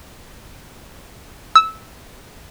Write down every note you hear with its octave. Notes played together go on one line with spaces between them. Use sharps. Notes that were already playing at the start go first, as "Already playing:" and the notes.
E6